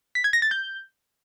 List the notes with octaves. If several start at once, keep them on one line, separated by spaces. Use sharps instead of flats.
B6
G#6
A#6
A6
G6